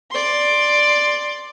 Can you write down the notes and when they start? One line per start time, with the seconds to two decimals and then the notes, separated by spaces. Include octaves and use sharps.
0.11 D5 C6